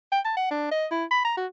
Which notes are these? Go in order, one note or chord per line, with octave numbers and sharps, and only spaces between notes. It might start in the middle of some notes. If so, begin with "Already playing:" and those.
G5
A5
F#5
D4
D#5
E4
B5
A#5
F#4